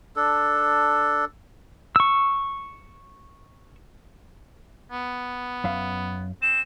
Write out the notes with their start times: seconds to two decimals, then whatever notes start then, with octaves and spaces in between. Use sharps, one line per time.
0.16 D4 A4
1.96 C#6 E6
4.91 B3
5.64 F#2 E5 F5
6.42 C4 E7